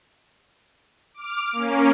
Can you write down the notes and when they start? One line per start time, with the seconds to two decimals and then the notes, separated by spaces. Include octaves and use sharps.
1.14 D6 F6
1.52 A#3 C#4